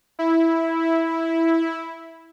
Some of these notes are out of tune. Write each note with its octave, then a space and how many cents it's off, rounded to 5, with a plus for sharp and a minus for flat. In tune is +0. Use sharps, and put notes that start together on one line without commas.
E4 -5